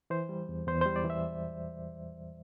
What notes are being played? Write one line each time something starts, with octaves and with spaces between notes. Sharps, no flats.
E3 C5
G3
E2
E2 C5
G3 C5
D5
E3
E5